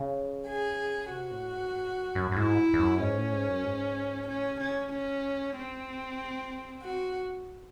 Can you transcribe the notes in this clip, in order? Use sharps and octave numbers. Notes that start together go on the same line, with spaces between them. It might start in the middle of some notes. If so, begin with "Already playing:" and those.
Already playing: C#3
G#4
C3 F#4
A2
G#2
F#2
G#2
F#2
F#2
F#2
G#2 E4
E2
F#2
G#2 C#4
A2
G#2
F#2
G#2
A2 C#4
C3
C#4
C#3
C3
C#3 C#4
C4
C3
A2
C3
F#4